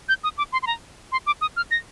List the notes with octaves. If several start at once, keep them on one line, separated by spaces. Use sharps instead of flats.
G6
D#6
D6
C6
C6
A#5
C6
D6
D#6
F6
A#6